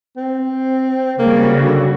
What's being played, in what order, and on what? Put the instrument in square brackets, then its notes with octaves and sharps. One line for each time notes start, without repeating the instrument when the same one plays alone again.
[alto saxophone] C4
[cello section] C#3 G3 F#4 [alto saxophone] A#3
[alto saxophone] D3